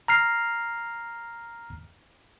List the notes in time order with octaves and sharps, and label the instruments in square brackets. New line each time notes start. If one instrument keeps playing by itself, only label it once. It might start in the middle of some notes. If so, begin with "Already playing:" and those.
[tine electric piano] A#5 F6 C7